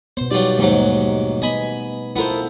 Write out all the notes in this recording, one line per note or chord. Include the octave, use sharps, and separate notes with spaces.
B2 B3 C5
F#3 G3 D#4 F4 G4 D5
D#2 G#2 F#3 A3 D#4 G4
B3 D#5 G#5 B5
B3 E4 F4 A4 A#4 C5